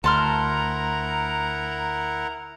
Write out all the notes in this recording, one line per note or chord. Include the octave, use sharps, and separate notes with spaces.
D2 E4 A#4 F#5 A5 A#5 C6 F6